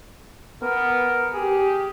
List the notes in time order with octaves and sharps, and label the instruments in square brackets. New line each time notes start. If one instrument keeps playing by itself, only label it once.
[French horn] B3 [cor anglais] A#4
[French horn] G4 [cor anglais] G#4